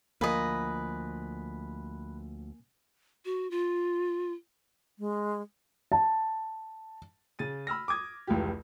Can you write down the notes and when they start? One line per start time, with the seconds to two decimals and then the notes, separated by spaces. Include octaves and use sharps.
0.21 D2 F3 A#3 B4 D#5 G#5
3.25 F#4
3.51 F4
4.99 G#3
5.92 A5
7.39 C#3 A6 D#7
7.67 B5 E6 F6 A#6
7.88 D6 D#6 G#6
8.27 F1 C#2 E3 F4 G4